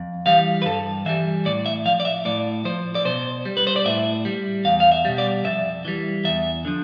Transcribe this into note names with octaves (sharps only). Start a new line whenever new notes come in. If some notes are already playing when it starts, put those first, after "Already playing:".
Already playing: F2
E3 G3 F5
B4
G2 A4
E3 G3 E5
A2 D5
E5
F3 F5
D5
E5
A2 D5
F3 C5
D5
B2 C5
G3
B4
C5
D5
A2 E5
G3
E2 F5
F5
E5
B2 G3
D5
F2 E5
E3 G3
E2 E5
D3 F3